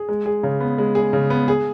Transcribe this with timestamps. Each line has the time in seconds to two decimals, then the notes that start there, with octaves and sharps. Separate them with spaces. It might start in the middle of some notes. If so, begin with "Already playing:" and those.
Already playing: G#4
0.09 G#3
0.26 G#4
0.43 C#3
0.60 B3
0.78 G#3
0.95 G#4
1.13 C#3
1.30 B3
1.48 G#4